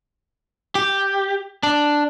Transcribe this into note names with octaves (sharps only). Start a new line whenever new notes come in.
G4
D4